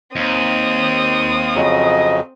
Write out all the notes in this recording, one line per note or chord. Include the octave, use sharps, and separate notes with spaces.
D#2 C4 D#6
F2 C#3 F#3 D#5